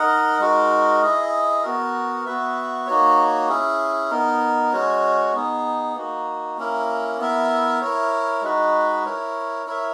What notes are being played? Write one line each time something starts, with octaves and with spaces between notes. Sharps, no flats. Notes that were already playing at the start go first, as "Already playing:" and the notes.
Already playing: D#4 A#4 D#5 F#5
G#3 D#4 F#4 A#4
E4 G#4 D#5
B3 F#4 A#4
B3 F#4 B4 E5
A#3 D#4 F#4 C#5
C#4 E4 G#4
B3 D#4 A#4
G#3 C#4 F#4 C#5
B3 D#4 G#4
A#3 D#4 F#4
A#3 C#4 E4 A#4
B3 E4 A#4 E5
E4 A#4 C#5
G#3 D#4 F#4 B4
E4 A#4 C#5
E4 A#4 C#5 E5